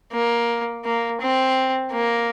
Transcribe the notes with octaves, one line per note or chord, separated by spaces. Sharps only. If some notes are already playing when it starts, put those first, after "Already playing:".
A#3
A#3
C4
A#3